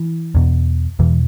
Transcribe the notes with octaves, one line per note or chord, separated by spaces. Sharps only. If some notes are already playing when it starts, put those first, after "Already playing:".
Already playing: E3
E2 B2
E2 B2 E3